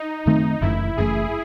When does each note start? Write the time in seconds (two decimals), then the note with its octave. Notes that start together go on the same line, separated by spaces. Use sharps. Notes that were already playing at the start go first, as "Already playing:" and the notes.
Already playing: D#4
0.25 F#2 D#3 A3 C4 D#4
0.61 F#1 F#2 E3 A3 E4
0.96 F#1 F#2 E3 A3 G#4